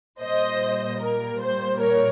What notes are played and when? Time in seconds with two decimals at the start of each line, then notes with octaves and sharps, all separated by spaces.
0.20 A#2 G3 A#3 C5 D#5
1.00 A#4
1.40 C5
1.80 A#4 C#5